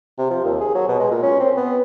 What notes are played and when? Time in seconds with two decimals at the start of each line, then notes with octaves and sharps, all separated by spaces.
0.18 C3
0.30 F3
0.44 D#2
0.60 G#4
0.75 F#3
0.88 B2
0.99 G#3
1.11 A#2
1.23 C#4
1.40 C4
1.57 B3